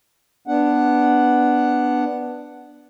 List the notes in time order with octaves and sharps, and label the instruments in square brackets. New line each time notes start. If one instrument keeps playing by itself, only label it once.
[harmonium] B3 D4 F#5